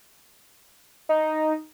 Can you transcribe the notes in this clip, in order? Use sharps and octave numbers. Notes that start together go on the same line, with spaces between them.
D#4